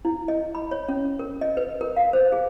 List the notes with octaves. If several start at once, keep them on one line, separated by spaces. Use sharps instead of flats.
E4
D#5
B5
C#5
C#4
A#4
D#5
B4
A#4
F5
C5
G#4